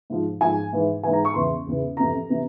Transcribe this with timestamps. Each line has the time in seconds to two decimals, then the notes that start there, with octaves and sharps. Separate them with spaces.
0.10 G#2 F3
0.41 G#2 F3 G#5
0.73 G#2 E3
1.03 G#2 E3 G#5
1.13 A#5
1.25 C#6
1.34 E2 C#3 E3 C6
1.66 E2 C#3 E3
1.97 F2 C3 E3 A#5
2.29 C3 E3